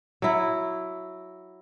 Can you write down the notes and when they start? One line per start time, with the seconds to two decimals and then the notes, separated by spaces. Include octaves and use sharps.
0.22 F#3 E4